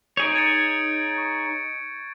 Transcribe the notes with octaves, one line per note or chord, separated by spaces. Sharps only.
D#4 G#4 C#5 G6 D7
G#6 A6 C#7
C#6